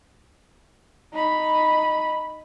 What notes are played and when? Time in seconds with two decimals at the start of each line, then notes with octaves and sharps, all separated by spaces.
1.12 D#4 B5